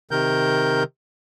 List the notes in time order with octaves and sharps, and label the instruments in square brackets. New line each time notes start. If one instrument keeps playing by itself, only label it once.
[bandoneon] C3 D#3 A#4 G6